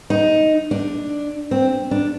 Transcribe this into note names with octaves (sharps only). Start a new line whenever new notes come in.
D#4
D4
C4
D4